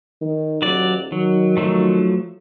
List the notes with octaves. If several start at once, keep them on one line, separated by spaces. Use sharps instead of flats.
D#3
D#1 F#3 D5
D#3 F#3
F3 F#3 A3